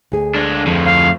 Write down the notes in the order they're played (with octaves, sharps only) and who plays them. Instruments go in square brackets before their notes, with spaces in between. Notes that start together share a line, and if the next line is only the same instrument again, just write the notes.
[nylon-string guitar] D2 G#4
[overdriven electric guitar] G#3 D4
[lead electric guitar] F2 [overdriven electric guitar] A2 F3
[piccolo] F5